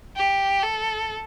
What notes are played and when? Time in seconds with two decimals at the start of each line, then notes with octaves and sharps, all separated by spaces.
0.16 G4
0.63 A4